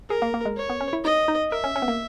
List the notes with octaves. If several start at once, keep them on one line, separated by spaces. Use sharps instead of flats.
G#4 A#4
A#3
A#3
G#3
C#5
B3
C#4
E4
D#4 D#5
D#4
A#4 E5
C#4
C#4
B3
A#3